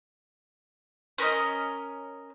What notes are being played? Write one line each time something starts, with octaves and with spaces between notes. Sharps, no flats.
C#4 A#4 B4 D#5